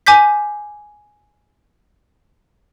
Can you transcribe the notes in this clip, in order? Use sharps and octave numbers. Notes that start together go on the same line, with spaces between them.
G#5 D6 G6 B6